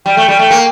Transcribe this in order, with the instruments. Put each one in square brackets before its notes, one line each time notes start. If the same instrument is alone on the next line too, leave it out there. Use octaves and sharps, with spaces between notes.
[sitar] G3 [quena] G5
[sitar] A3
G3
A3
A#3